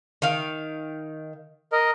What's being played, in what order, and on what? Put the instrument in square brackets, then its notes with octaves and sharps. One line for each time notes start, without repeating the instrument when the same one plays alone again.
[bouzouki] D#3 F5
[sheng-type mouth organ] A#4 D#5